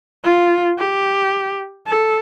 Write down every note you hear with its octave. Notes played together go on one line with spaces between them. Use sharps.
F4
G4
A4